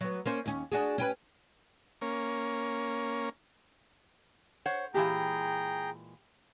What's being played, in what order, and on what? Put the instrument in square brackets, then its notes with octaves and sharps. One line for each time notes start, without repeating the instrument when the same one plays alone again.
[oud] F#3 B3
A#3 C#4 C5
D#2 C#4
D4 F#4 G#4
C#4 G4 B4
[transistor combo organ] A#3 C#4
[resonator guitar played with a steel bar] C5 C#5 F#5
[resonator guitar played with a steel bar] A#2 E3 G#3 [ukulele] G4 [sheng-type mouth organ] G#4 G5 A#5